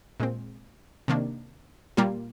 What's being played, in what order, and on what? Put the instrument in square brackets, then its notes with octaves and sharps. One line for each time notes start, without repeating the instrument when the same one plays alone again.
[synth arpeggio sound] A#2 G#3 C4
C3 D#3 A#3 D4
A#2 G3 A#3 F4